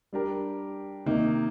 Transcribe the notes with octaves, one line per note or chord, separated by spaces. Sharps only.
G3 D4 G4 A#4
C3 D#3 A#3 D#4